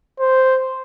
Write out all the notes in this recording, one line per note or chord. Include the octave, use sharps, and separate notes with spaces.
C5